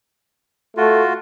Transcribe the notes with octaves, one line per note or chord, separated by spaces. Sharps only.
A3 F4 F#4